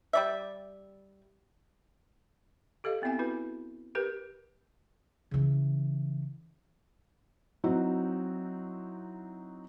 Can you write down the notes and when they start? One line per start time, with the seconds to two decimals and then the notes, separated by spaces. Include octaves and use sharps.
0.13 G3 D5 E5
2.84 G4 A4 D#5 F5
3.02 B3 C4 E4 E5 G#5
3.19 E4 F#4 B4
3.95 G4 A#4 B4
5.31 C#3 E3
7.64 F#3 C4 D#4 E4 F#4